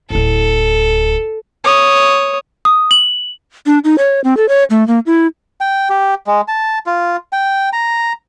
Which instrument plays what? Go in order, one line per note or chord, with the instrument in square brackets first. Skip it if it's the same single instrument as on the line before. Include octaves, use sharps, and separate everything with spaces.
[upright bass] D1 E4 [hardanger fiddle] A4
[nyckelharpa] C#5 D#6
[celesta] D#6
F#7
[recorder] D4
D#4
C#5
C4
A4
C#5
A3
A#3
E4
[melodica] G5
G4
G#3
A5
F4
G5
A#5